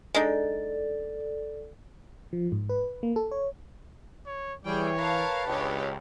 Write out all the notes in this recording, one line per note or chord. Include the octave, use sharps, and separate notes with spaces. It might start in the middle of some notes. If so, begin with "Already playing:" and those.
G#3 D4 D#4 A4 D5
F3
G#2
B4
A#3
A4
C#5
C#5
E3 G3 G#4 C#5 G5
A#4 B4 F5 A5
C#2 D4 G4 C#5